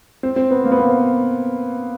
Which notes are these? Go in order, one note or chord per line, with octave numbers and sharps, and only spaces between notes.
C4
C4
B3
A#3
B3
A#3